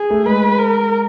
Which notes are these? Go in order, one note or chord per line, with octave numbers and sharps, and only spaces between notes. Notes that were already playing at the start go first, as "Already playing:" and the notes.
Already playing: G#4
A3
G#3 B4
A#4